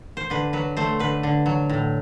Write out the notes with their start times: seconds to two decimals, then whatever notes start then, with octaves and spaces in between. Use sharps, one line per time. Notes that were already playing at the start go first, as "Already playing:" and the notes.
0.17 C5
0.30 D3 B4
0.53 F#3 B4
0.77 A3 C5
1.00 D3 B4
1.23 D3
1.46 F#3
1.69 A2